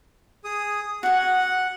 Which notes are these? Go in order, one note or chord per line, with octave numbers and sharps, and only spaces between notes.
G#4 D#6
F#4 G#4 F#5